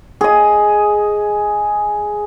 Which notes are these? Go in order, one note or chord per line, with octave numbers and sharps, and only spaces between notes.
G#4 D#5